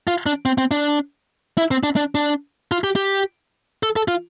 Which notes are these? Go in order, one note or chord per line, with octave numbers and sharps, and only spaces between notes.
F4
D4
C4
C4
D4
E4
C4
D4
D4
D4
F4
G4
G4
A4
A4
F4